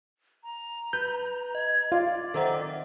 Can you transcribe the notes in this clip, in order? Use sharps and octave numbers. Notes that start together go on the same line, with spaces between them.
A#5
B4 G6
D#5 G#6
F4 D5
D#3 C4 D#4 A4 E5 F#5